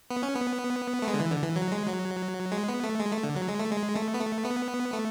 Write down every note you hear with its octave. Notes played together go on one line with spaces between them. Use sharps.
B3
C#4
B3
A3
G#3
D3
E3
D3
E3
F#3
G#3
F#3
G#3
B3
A3
G#3
A3
D3
F#3
G#3
A3
G#3
A3
B3
A3
B3
A3